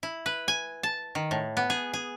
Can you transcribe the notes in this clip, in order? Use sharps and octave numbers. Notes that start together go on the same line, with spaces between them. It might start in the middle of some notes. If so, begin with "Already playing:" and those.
E4
B4
G#5
A5
D#3
A2
B3
G#4
G#4